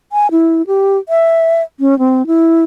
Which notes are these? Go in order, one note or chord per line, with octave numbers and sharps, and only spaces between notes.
G#5
E4
G4
E5
C#4
C4
E4